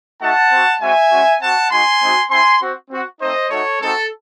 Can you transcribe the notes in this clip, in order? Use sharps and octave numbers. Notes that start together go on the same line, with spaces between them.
A3 D#4 F#4 F#5 A5
C4 F#4
G#3 C4 F#4 E5 G#5
G#3 C#4 F#4
C4 F#4 F#5 A5
G#3 D#4 F#4 G#5 C6
G#3 C4 D#4 F#4
C4 E4 G#5 C6
C4 F#4
C4 F#4
A3 C4 D#4 C5 D#5
A3 D#4 F#4 A4 C#5
G#3 C4 D#4 F#4 A4